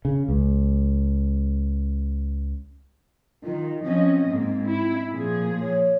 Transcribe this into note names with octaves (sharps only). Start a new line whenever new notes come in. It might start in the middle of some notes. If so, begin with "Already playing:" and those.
C#3
C#2
D#3 F4
F3 C4 C#4 D#5
G#2 A#3
E4
A#2 F3 G#4
C#5